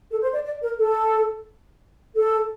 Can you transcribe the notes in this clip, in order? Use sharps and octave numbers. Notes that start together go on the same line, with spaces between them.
A4
C5
D5
D5
A#4
A4
A4